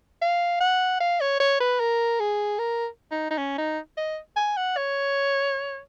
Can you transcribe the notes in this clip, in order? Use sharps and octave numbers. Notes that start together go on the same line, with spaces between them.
F5
F#5
F5
C#5
C#5
B4
A#4
G#4
A#4
D#4
D#4
C#4
D#4
D#5
G#5
F#5
C#5